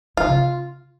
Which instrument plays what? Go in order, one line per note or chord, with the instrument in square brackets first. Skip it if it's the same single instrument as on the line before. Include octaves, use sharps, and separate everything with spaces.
[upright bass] F3 [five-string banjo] F4
[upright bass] C#3